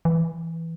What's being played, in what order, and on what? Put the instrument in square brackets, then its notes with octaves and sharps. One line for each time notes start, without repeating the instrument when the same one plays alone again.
[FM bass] E3